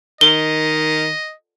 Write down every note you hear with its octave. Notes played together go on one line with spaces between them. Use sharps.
D#3 D#5 G7